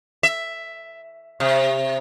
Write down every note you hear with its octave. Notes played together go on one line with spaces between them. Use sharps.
E5
C3